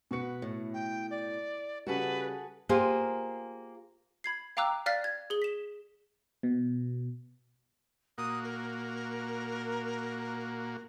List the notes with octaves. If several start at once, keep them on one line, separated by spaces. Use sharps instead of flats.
B2 F#4 B4 C#6 C#7
A2
G5
D5
C#3 G3 F#4 G#4 A4 B4
A#3 F4 G4 G#4 A#4 C5
B5 G#6 C7
F5 G5 A#5 D6 E6 F#6
D5 F5 F6 F#6 A6 B6
G#6
G#4 G7
B6 E7
B2
A#2 A#3 F#4 D#6
A#4